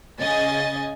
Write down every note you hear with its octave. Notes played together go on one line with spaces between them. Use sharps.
C#3 D#5 G#5 A6